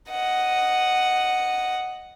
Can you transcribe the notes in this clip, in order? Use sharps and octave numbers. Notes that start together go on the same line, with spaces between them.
D#5 F#5